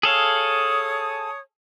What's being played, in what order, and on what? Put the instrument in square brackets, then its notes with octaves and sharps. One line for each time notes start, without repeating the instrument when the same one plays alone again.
[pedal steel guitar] G#4 A4 F5 [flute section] C#5 D#6